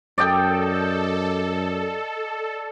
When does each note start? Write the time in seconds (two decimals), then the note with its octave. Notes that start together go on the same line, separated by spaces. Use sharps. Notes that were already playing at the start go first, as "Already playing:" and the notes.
0.18 F#2 A4 D5 D#5 G5